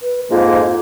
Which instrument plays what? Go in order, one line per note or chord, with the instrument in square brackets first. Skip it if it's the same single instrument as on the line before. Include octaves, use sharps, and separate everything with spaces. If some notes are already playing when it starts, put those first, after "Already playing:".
[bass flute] B4
[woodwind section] F2 G#2 A#3 [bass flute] F4